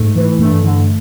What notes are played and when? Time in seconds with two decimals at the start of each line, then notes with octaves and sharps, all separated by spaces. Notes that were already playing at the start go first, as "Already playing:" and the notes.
Already playing: G#2 A3
0.15 E3
0.39 G2 A3
0.63 D3